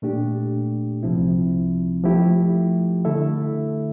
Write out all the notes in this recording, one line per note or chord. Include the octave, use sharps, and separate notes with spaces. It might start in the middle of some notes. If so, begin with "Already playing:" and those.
A#2 A3 D4 G4
C2 C3 F3 C4 E4
F3 A3 E4 G4
D3 A3 E4 A4 E5